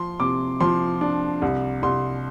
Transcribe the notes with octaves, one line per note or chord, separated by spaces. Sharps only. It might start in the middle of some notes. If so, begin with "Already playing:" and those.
Already playing: F3 C6
C3 D6
F3 C6
D4
C2
C2 C6